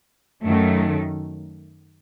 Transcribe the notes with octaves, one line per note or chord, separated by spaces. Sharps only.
F#2 D#3 F#3 A3